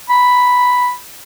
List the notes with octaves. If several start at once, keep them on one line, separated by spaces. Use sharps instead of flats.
B5